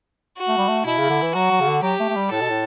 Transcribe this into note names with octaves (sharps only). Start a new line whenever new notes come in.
F#4
A3
G3
A3
B2 E4
C#3
D3
E3
F#3 F#4
F#3
C#3
D3
F#3 G4
A3
A3
G3
A2 A4
B2
A2